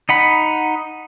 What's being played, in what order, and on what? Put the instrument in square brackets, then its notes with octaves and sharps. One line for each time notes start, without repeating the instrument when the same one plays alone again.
[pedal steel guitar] D#4 F#5 B5